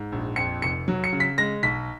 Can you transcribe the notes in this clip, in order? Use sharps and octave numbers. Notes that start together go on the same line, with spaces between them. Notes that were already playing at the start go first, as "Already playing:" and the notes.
Already playing: G#2
A#1
F2 C#7
F1 C#7
F#3
C#7
C#3
B6
G#3 A#6
B1 B6